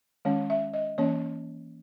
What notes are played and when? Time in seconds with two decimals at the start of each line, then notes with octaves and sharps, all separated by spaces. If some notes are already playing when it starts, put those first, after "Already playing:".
0.25 D#3 G#3 C#4 C#5
0.50 E5
0.74 D#5
0.98 E3 A#3 C#4 C#5